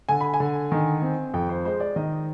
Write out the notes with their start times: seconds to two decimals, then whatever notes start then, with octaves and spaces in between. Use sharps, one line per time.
0.09 D3 G#5
0.21 B5
0.34 G#5
0.40 D3
0.72 D#3
1.02 C4
1.34 F2 G5
1.49 C5
1.65 G#3 C5
1.80 D5
1.96 D#3 D#5